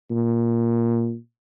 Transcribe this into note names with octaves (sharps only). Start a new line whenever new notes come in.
A#2